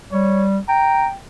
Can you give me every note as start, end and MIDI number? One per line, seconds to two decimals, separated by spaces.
0.12 0.59 55
0.12 0.46 73
0.69 1.15 79
0.69 1.07 82